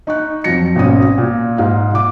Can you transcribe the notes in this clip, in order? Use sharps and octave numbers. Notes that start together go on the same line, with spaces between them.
D#4 C#6 F#6
F2 F3 F#3 A#6 C#7
G#1 B2 C#4 D#6
A#2
G#2 F5
A#2 D6